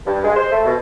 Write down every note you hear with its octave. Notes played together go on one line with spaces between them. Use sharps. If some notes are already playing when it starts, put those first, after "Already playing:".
G2
G#3
C5
A3
B2